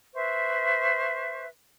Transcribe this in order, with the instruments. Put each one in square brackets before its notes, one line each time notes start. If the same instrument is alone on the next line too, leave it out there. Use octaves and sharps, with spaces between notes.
[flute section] B4 C5 E5 C#6